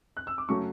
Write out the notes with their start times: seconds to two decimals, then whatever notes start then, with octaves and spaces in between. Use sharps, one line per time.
0.17 F#6
0.27 E6
0.38 D6
0.49 C#3 F#3 A3 C#4 C#6